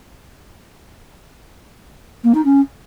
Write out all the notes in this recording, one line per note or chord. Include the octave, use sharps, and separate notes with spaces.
A#3
D#4
C#4